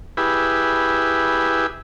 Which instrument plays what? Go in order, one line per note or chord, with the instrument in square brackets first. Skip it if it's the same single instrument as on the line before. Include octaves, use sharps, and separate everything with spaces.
[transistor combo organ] E4 G4 G#4 B4